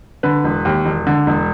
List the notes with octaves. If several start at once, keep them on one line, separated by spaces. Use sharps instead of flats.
D3 B4
E1
D#2
E1
D3
E1